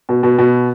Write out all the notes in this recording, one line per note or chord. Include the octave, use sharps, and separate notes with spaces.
B2
B2
B2